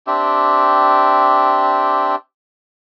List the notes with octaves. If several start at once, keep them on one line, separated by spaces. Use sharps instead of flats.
C4 D4 G4 E5